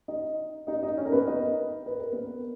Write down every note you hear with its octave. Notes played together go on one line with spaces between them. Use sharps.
D#4 D#5
D#4 D#5
D#4 D#5
C#4 C#5
A#4
B3 B4
D#4 D#5
B4
A#4
B3 B4